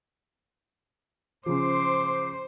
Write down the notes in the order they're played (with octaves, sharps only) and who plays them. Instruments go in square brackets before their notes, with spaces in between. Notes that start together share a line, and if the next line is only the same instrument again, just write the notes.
[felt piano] C#3 F3 [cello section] C5 [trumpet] D6